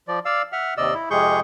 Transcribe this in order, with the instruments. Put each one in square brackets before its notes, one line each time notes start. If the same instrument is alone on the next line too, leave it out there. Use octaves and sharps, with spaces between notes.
[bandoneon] F3 D5
D5 F5 E6
E5 F#5 F6
D#2 C3 D5 D#5 E6
E4
F2 C3 G#3 G#4 C#6 G6